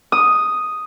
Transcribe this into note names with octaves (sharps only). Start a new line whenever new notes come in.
D#6